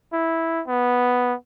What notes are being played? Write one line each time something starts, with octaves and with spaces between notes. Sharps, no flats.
E4
B3